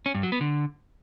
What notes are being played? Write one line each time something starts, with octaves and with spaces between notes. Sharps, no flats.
C#4
G2
F#3
B3
D3